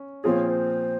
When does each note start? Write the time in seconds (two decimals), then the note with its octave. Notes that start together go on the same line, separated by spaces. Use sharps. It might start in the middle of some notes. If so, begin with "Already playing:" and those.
Already playing: C#4
0.24 A#2 F3 C4 F4 G#4 C#5
0.50 C5